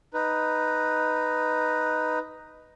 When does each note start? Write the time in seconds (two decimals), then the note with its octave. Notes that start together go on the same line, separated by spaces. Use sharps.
0.14 D#4 B4